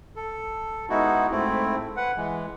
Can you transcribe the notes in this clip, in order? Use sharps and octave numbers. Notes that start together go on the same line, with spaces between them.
A4
G#3 B3 D#4 E4 F#4
G#2 A3 C4 E4
B4 F#5
E3 G#3